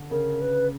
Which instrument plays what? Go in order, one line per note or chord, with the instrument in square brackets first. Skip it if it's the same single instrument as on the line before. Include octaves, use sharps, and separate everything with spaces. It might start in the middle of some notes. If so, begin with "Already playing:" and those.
Already playing: [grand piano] D3
[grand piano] C#3 [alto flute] A#4
[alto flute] B4